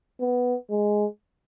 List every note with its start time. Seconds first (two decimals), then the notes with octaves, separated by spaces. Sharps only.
0.20 B3
0.70 G#3